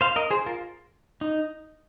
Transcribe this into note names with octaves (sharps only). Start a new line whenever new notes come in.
C5 F5
A#4 D#5
G#4 C5
F4 A#4
D#4